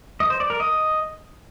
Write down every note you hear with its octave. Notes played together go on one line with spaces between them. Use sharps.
D#5
C5
D5
A#4
D#5